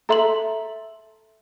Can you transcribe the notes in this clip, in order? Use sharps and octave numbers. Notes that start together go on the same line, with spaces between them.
A4 E5 A#5 C6 F#7